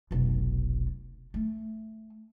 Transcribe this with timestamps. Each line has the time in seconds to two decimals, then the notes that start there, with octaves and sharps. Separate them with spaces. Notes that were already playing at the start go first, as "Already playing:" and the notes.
0.11 F1 B1
1.34 A3